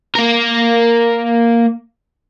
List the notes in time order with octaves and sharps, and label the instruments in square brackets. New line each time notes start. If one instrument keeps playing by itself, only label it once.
[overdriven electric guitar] A#3 A#4